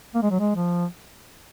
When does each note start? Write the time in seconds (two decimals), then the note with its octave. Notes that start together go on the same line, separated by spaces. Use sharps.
0.14 A#3
0.22 G#3
0.31 F#3
0.39 G#3
0.56 F3